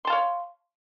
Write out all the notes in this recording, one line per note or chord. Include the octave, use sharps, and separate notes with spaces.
C#5 F5 A5 C6